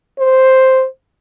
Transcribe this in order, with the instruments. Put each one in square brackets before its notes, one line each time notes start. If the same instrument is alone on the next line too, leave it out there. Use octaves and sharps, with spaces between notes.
[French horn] C5